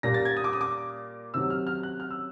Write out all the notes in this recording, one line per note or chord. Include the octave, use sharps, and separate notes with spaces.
A#2 G3 A#3 A#6
A6
G#6
D#6
D6
D#6
D6
C3 D#3 F#3 E6
F6
F6
F#6
F6
E6